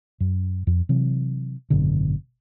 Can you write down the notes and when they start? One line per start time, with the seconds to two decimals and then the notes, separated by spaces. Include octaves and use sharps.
0.20 F#2
0.67 F2
0.89 C3 E3 F#3
1.70 G#1 F#2 B2 D3